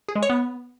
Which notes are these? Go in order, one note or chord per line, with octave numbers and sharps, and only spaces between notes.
G#4
G#3
C#5
B3